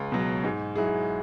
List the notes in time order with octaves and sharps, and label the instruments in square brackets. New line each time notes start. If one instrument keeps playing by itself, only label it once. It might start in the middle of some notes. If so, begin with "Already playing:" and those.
Already playing: [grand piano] C#2
B2 F#3
G#2
F#3 E4 G#4